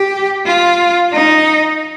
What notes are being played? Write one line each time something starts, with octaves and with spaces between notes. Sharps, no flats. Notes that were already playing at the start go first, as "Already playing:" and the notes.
Already playing: G4
F4
D#4